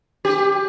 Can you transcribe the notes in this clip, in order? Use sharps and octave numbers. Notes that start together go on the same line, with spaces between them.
G4